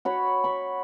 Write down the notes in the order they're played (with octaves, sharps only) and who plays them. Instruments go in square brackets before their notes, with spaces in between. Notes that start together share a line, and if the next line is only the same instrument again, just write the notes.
[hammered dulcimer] F#4 C#5 B5
B5 C#6